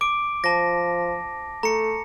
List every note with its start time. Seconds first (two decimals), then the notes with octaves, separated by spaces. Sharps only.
0.01 D6 D7
0.44 F3 A5 A#6
1.63 A3 A#5 C#7